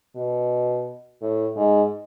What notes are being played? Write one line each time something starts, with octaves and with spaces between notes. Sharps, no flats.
B2
A2
G#2